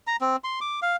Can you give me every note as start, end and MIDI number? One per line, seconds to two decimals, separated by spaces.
0.07 0.16 82
0.21 0.36 60
0.44 0.60 84
0.61 0.80 86
0.82 0.96 77